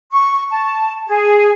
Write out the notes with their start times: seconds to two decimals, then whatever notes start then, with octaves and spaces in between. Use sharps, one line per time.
0.11 C#6
0.51 A5
1.07 G#4